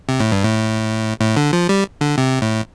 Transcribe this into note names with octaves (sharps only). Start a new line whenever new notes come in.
C3
A2
G2
A2
A2
D3
F3
G3
D3
C3
A2